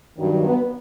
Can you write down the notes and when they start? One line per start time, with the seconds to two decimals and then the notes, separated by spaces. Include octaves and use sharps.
0.18 G2 D#3 F#3
0.46 B3